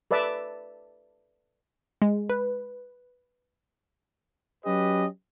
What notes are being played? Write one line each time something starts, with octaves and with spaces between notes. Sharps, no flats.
A4 B4 D5 E5 A5
G#3
B4
F#3 C#4 G4 B4 D#5